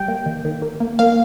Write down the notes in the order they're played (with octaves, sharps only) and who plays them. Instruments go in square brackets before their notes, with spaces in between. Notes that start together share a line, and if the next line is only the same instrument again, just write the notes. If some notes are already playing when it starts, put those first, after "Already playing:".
Already playing: [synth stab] G3 G5
A#3
D#3
D#3
A#3
A#3
A#3 F5